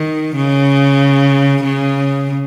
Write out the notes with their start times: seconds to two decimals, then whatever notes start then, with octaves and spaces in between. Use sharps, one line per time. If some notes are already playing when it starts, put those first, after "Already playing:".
Already playing: D#3
0.36 C#3
1.64 C#3